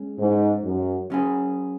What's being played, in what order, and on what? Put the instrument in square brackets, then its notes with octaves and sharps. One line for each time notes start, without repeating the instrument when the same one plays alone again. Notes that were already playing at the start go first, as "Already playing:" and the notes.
Already playing: [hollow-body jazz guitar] G#3 C#4
[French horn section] G#2
F#2
[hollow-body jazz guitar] F#3 C#4 G#4